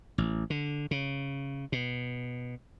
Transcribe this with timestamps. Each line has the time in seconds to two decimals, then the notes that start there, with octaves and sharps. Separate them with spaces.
0.18 A1
0.50 D3
0.91 C#3
1.72 B2